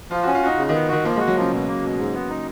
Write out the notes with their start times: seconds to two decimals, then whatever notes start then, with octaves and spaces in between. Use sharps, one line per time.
0.10 F3 F4
0.23 F#4
0.27 C#4
0.35 F4
0.42 D#4 F#4
0.57 C#3
0.69 D#3
0.73 B3
0.89 D#3 F#4
1.04 F3 A#3
1.16 G#3
1.20 F#4
1.27 F#3
1.36 C#3 F3
1.52 B2
1.67 A#3
1.83 B2
1.99 G#2
2.14 B3
2.30 D#4